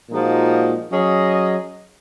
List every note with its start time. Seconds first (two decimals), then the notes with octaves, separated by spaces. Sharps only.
0.10 A#2 F3 G#3 D#4 F#4
0.91 F#3 C#4 G#4 D#5